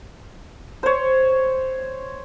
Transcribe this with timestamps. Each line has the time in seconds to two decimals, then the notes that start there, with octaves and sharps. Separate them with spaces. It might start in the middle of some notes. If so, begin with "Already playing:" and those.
0.83 C5 C#5